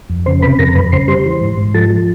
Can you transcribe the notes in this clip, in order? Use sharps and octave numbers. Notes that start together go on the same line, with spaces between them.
F2
C#3 C5 C6
C3 B4 B5
F2 A#4 A#5
A#5
F#2 B4 B5
C#3 C5 C6
G3 C5 C6
E3
G#2
G#2
F3 A4 A5
F3